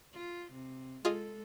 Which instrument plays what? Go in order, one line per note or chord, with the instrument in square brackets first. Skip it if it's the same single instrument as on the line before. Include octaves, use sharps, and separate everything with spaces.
[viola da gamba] F4
C3
[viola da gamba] G#3 A4 [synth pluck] F4 G#4 D#5